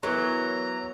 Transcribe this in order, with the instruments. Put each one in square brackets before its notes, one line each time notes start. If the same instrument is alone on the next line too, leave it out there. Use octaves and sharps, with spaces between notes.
[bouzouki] E3 F#3 [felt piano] B3 A#4 [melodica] A#5